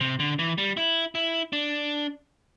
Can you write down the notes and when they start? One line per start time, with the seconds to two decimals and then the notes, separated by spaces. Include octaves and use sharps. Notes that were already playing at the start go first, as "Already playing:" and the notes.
0.01 C3
0.20 D3
0.39 E3
0.58 G3
0.77 E4
1.15 E4
1.53 D4